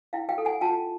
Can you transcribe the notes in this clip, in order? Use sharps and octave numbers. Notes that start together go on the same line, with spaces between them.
E4 F5 G5
F5 G5
A4
F#5 G#5
F4 G5 A5